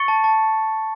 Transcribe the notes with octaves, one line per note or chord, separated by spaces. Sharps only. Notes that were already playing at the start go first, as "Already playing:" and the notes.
Already playing: C#6 A6 C#7
A5
A5